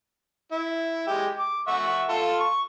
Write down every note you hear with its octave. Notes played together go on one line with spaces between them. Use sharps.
E4
G#3 G4
D6
E5 F#5 C#6
F4 A4
C#6